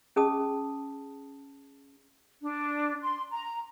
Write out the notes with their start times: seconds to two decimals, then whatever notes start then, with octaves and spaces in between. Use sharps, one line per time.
0.16 C#4 G#4 A5 D#6
2.41 D4
3.02 C6
3.31 A#5